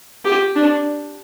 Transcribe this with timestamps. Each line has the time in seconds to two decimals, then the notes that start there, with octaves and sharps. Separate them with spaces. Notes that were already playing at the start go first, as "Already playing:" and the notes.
0.25 G4
0.56 D4